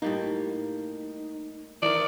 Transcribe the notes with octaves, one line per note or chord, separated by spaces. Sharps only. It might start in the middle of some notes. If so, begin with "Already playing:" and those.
A2 G3 A#3 D#4
D#3 E3 A#4 D5